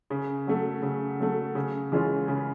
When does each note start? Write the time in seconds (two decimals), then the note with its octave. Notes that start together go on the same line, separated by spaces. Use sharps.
0.10 C#3
0.47 F#3 A3
0.82 C#3
1.20 F#3 A3
1.55 C#3
1.92 E3 G#3 C#4 F4
2.28 C#3